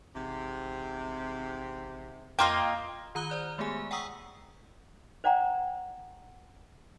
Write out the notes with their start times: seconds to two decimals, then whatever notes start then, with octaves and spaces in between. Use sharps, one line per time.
0.15 A1 G#2 C3
2.39 F2 A#3 F4 D#5 G5 A#5 F6
3.15 D#3 F4 A#5 D#6 F#6 G7
3.30 C5 D5 F#6
3.58 G#3 A3 B3 G4 G#4 G#5
3.91 F#5 G5 A#5 C#6 D#6 E6
5.24 C5 D5 F#5 G5 A#5